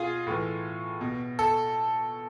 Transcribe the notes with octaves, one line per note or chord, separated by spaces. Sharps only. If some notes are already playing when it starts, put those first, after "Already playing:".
Already playing: B2 F4 G#4
A2 E3
B2
A4